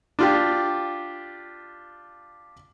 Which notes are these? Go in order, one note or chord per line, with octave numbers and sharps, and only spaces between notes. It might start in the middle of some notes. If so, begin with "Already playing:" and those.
D4 F4 G4